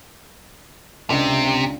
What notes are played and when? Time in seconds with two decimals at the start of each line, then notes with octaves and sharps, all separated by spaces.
1.10 C#2 C3 D4 D#5